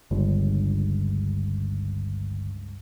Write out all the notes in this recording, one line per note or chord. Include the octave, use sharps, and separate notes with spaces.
G1 C#2 G2